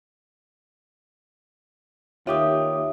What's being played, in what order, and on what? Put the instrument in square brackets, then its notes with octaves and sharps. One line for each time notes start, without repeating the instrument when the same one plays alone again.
[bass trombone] D#2 [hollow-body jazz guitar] F4 G4 [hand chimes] C#5 D6 D#6 [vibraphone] E5